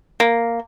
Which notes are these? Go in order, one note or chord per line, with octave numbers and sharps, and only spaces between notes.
A#3